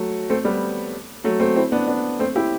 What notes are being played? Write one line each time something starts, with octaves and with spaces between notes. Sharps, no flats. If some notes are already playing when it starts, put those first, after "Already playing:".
Already playing: F#3 A3
A3 C4
G3 B3
F#3 A3
A3 C4
C4 E4
B3 D4
B3 D4
A3 C4
E4 G4